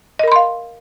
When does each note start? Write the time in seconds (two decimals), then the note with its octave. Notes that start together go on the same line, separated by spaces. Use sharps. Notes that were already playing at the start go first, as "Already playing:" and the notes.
0.19 D#5
0.24 A#4
0.28 B5
0.32 C6
0.36 F5